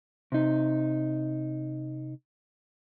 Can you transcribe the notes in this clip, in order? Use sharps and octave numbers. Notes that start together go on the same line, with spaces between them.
C3 D#4